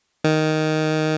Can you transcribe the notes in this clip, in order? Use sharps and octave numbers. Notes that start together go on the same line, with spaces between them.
D#3